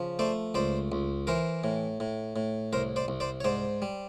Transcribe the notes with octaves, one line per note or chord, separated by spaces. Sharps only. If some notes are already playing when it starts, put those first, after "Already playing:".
Already playing: C#3 F3
A3 C5 D5
C#2 C5 D5
C#2
E3 A#4 C5
A2
A2
A2
C2 A#4 C5
C5 D5
C2
C5 D5
C#5
G#2 C5 D5
G3